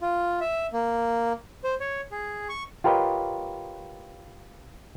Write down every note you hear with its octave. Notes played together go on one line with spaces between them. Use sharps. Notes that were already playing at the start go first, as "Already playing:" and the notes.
F4
E5
A#3
C5
C#5
G#4
C#6
F4 G4 A#4 B4 C#5 D#5